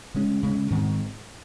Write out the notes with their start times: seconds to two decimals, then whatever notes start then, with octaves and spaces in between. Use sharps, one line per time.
0.14 C#3 G#3 C#4
0.43 C#3 G#3 C#4
0.70 G#2 D#3 G#3 C4